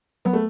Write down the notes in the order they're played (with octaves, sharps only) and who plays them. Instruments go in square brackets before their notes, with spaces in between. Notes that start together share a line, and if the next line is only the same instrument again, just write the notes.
[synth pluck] F#3 [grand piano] B3
[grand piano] A3